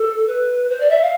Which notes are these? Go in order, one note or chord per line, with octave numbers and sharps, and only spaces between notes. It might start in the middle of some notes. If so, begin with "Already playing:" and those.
Already playing: A4
B4
C5
D5
E5
F5